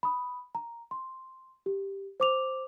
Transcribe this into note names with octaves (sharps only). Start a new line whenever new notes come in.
B5 D#6
A#5
C6
G4
C5 D6 F7